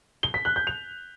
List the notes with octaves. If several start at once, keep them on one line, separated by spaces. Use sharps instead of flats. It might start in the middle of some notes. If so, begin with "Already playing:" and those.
G7
B6
F#6
G6
F7